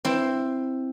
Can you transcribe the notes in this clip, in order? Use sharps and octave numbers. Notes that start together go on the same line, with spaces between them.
C4 E4